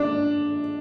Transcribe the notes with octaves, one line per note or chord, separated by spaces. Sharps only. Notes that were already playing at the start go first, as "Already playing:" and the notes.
Already playing: D4